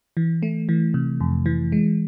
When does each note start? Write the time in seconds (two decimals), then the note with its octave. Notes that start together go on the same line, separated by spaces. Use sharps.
0.17 E3
0.43 A3
0.69 E3
0.94 C3
1.20 F2
1.46 E3
1.72 G#3